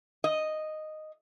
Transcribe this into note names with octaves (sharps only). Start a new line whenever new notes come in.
D#5